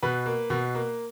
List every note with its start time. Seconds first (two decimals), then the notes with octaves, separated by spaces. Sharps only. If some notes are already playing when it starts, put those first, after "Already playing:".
0.02 B2 B4
0.26 A#3
0.50 B2
0.75 A#3